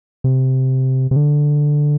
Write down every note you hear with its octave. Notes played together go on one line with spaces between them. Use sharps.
C3
C3
D3